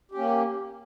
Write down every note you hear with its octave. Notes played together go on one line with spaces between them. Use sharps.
A#3 C#4 G4